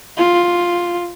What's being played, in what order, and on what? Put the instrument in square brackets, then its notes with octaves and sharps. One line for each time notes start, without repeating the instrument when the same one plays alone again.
[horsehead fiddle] F4